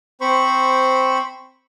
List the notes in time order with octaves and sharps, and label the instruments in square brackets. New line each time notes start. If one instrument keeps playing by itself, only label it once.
[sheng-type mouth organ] C4 C5 B5 C#6